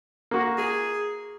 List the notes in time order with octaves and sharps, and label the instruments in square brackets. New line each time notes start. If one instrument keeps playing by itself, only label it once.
[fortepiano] A#3 F#4
[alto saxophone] G#4